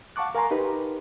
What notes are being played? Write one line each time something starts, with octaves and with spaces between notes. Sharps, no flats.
F5 F#5 A5 C#6 D6 F#6
A#4 F5 G#5 A#5 C6
D#4 G4 A#4 B4